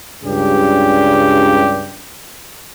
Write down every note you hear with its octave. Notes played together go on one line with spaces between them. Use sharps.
C#2 G2 C#3 G3 D4 G4